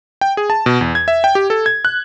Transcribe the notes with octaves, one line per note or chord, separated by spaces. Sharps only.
G5
G#4
A5
B2
E2
G#6
E5
G5
G4
A4
G#6
F#6